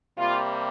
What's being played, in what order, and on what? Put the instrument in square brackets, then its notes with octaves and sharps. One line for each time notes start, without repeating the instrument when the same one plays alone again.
[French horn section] C3 G3 A#3 F4